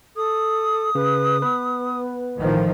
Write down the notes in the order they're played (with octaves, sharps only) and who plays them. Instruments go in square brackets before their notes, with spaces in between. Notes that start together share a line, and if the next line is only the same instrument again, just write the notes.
[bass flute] A4 [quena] D#6
[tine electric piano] C#3 [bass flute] B4
[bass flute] B3 [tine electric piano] B4
[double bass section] A1 D#3 F3